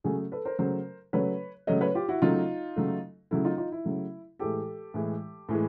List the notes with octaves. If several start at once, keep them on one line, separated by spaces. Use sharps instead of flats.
C#3 F#3 A3 F#4 G#4
A4 B4
A#4 C5
C#3 F#3 A3 A#4 C5
C#3 F#3 A3 B4 C#5
C#3 F#3 A3 C#5 D#5
B4 C#5
F4 G4
E4 F#4
C#3 F#3 A3 D#4 F4
C#3 F#3 A3
C#3 F#3 A3 E4
D#4 F4
D#4 F4
E4
C#3 F#3 A3
A2 E3 G#3 G4 A4
A2 E3 G#3
A2 E3 G#3